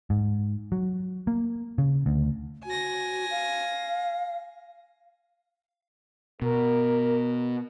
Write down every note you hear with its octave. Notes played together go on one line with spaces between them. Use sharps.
G#2
F#3
A#3
C#3
D2
F#4 G#5 A#6
F5
B2 A#4